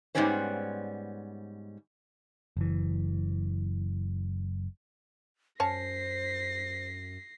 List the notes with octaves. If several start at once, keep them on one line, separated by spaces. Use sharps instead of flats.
G#2 D#3 G3 B3 C#4 C5
F#1 E3
F#2 C#4 C5 C#5 A5 A#6 C7